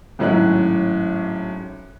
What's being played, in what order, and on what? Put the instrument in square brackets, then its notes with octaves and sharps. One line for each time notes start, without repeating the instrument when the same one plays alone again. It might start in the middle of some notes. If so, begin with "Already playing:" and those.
[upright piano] G#1 A2 F#3 C#4 F#6